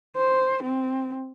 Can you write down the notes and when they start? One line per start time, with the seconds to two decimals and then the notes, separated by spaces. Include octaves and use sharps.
0.17 C5
0.64 C4